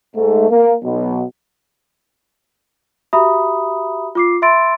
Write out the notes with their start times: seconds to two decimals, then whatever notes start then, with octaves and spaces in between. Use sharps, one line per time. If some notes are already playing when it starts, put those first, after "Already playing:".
0.16 G#2 A3
0.50 A#3
0.83 B1 B2
3.13 F#4 G4 E5 A#5 B5 D#6
4.15 F4 D6 C7
4.42 E5 B5 C6 E6 A6 D7